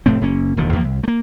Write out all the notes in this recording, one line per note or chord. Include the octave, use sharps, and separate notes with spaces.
F1 A2 A3 C4
F#1 A#3 C#4
E1 D#2 D3
E2 F3 G#3 A#3
C2
A3 A#3